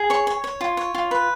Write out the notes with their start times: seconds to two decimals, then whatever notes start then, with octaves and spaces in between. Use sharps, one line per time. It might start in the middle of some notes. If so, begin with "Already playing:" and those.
Already playing: G#4
0.10 C#5 C#6
0.27 C#5
0.44 C#5
0.61 F4
0.77 C#5
0.94 F4
1.11 B4